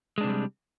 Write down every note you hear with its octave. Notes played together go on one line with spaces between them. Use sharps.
C3 E3 G3 G#3 D4